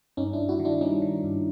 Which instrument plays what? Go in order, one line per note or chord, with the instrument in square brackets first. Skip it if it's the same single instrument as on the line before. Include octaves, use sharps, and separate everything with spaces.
[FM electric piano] G2 C#4 D#4
D4 E4
G2
E4 F#4
D#3
D4 E4
G3 C#4 D#4
D#3
G2